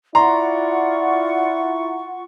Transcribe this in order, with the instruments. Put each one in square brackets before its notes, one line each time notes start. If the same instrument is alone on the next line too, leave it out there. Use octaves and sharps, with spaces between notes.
[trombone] E4 [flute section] F4 F#5 C#6 [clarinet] D5 [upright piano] A#5 C6